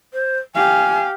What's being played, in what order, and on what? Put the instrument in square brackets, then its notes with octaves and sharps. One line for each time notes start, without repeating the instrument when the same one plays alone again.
[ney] C5
[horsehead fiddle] G4 F5 [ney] G#5